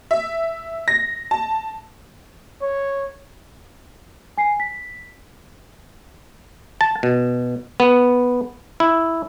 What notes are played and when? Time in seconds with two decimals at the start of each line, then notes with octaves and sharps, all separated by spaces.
0.11 E5
0.88 A#6
1.31 A5
2.62 C#5
4.37 G#5 C7
4.60 B6
6.81 A5
7.03 B2
7.80 B3
8.80 E4